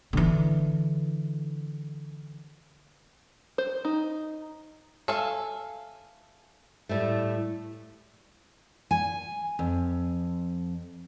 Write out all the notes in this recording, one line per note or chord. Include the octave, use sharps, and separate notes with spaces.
D3 E3
C5
D#4
A4 E5 F5 G#5
A2 G3 A3
G#5
F2